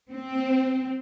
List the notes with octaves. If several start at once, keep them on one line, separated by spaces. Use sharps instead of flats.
C4